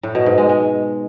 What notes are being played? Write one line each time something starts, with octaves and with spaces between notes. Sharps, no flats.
A2
B2
G#2
G#3
G#3